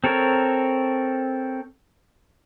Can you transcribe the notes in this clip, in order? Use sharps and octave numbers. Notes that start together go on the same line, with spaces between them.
C4 A4 A#4 C#5